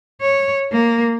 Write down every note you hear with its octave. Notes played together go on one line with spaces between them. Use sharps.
C#5
A#3